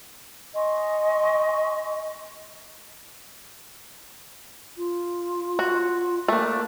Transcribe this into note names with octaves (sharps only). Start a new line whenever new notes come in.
D#5 G#5 C6 C#6
F4
F#4
A3 A#3 D4